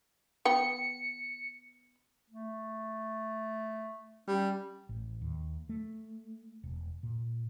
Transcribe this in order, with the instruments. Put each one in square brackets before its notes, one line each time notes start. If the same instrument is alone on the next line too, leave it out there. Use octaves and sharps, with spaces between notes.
[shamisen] B3 G5 [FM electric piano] C#7
[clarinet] A3
[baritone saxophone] G3 [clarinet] C#4
[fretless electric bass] A1
D#2
A3
E1
A#2